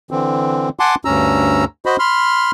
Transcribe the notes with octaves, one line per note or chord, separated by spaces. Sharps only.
D3 E3 C4
F#5 G#5 A5 C6 D6
D2 G2 C#4 A#5 E6
F#4 C5 D#5 B5
B5 C6 F6